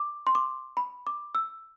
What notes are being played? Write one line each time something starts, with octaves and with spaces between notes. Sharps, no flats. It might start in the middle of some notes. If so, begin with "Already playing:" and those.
Already playing: D6
C6
D6
B5
D6
E6